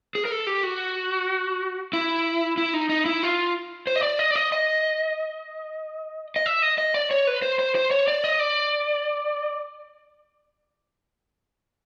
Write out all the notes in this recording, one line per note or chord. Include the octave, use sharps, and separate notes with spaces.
G#4
A#4
A4
G4
F#4
E4
E4
D#4
D#4
E4
F4
C5
D#5
D5
D#5
D5
D#5
D#5
D#5
E5
D#5
D#5
D5
C#5
B4
C5
C5
C5
C#5
D5
D#5
D5